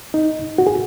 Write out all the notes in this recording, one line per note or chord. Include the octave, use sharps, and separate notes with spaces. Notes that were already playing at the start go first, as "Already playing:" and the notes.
D#4
F#4
G#4